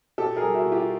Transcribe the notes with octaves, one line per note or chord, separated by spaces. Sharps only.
B2 G4 A4
G#4 A#4
G3
E4 F#4
B2
F4 G4